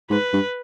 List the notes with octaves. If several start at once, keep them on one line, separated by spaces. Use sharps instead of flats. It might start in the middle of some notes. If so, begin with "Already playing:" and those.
G#2 B4
G2